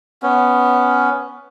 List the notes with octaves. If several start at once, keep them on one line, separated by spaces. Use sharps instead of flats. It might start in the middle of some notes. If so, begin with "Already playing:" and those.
B3 C#4